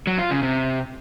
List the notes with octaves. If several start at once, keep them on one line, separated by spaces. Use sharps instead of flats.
F#3
F4
C#3
C3